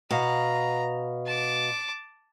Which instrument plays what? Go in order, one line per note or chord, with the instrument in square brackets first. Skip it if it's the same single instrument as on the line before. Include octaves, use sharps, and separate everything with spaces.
[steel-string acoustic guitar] B2 F5 F#5 [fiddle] A#5
[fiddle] A5 D6